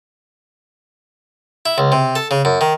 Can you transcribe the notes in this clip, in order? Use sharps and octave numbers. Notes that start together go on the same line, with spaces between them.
E4
C#2
C3
A4
C#3
F#2
D#3